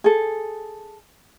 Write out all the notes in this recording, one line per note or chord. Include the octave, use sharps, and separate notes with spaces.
G#4 A4